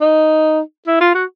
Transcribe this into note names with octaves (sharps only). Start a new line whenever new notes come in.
D#4
E4
F4
F#4